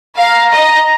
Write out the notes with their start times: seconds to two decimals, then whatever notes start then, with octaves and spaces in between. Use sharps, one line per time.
0.17 F5 A#5
0.52 D#5